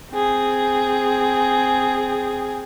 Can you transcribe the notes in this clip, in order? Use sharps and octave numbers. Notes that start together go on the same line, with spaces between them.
C4 G#4